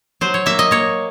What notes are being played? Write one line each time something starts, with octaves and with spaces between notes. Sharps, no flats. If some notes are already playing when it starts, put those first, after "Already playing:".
F#3 C5
C#5
A#3 E5
D#5
A#3 C#5